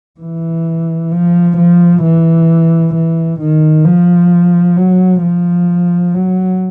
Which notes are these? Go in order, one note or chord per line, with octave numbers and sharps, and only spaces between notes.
E3
F3
F3
E3
E3
D#3
F3
F#3
F3
F#3